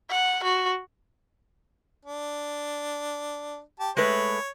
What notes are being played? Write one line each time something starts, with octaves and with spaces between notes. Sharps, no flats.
F#5
F#4
D4
G4 A5
G#3 A3 B4 C#5